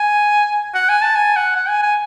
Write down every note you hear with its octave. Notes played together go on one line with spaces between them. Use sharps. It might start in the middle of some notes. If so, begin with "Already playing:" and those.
Already playing: G#5
F#5
G#5
A5
G#5
F#5
F#5
G#5
G#5